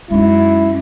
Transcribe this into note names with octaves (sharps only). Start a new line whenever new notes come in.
F#2 G#3 D#4 E4